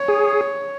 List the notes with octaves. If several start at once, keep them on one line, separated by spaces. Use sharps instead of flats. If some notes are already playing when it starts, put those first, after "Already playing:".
Already playing: C#5
G#4